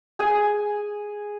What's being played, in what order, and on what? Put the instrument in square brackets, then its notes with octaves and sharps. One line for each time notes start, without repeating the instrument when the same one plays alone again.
[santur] G#4 G#5